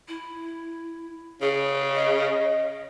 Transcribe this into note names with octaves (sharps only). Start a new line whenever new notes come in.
E4
C#3 G#4
D#5